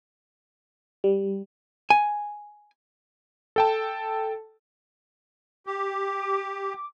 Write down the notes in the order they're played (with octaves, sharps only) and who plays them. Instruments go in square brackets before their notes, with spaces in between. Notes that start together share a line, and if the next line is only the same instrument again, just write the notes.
[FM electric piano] G3
[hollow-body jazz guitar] G#5
[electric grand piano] A4 G5 A5
[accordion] G4 [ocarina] D6